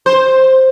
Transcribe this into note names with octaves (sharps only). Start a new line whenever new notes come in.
C5